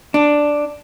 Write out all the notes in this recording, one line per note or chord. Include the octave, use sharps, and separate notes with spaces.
D4